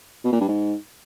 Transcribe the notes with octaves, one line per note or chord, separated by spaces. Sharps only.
B2
A#2
G2
G#2